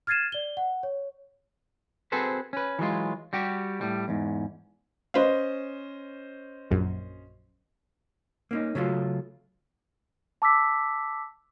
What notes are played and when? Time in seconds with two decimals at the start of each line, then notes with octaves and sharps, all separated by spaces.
0.07 F6 G#6 A6 C7 D#7 E7
0.32 D5 G7
0.57 F#5
0.83 C#5
2.12 C4 F#4 G#4 A4 B4 C5
2.53 C#4 B4
2.79 E3 F#3 G#3 F4
3.33 G3 F#4 G4
3.81 A2 G3
4.08 E2 G#2
5.14 C#4 B4 C5 D#5 F5
6.71 A#1 F#2
8.51 A#3 C#4 D#4
8.75 C#3 F#3 A3 F4
10.42 A5 D6 E6 B6